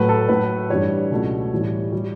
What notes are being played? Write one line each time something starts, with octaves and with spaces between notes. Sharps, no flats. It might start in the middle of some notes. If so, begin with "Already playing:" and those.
Already playing: A2 F#3 A3 B4
A4
A2 F#3 A3 B4
G2 E3 G3 C#5
C#2 B2 F#3 A3
A2 E3 G3
E3 G3